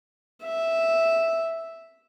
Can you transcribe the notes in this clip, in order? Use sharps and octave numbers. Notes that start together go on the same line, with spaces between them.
E5